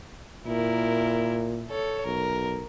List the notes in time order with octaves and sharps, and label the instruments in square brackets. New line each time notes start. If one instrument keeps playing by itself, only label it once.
[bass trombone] A#2 [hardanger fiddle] E4 A#4
[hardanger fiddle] A4 C#5
[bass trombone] B1 [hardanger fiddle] A#4